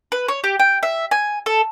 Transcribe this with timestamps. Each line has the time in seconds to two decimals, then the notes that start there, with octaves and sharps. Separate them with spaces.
0.12 B4
0.28 C#5
0.44 G4
0.59 G5
0.83 E5
1.11 G#5
1.46 A4